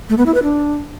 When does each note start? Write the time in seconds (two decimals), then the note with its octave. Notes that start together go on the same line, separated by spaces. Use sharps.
0.09 A3
0.18 B3
0.26 E4
0.34 B4
0.43 D4